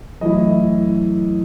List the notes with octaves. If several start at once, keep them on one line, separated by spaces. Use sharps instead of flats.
F#2 E3 A3 E4 D#5